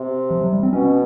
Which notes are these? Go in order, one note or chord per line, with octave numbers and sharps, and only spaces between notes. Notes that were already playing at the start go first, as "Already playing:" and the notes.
Already playing: C3
F3
F#3
G3
C4
B2 C#4